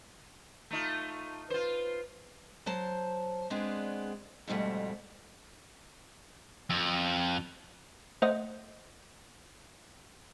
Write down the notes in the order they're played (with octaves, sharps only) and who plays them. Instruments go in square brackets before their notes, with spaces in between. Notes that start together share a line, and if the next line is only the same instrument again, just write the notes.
[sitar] A3 D#4 F4
[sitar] F4 C5 [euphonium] B4
[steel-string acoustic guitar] F#3 C5 A5
G#3 B3 C4 D4 G#4 D5
F2 G#2 B2 G3 A3
[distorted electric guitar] F2
[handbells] A3 C5 D#5 F#5 D#6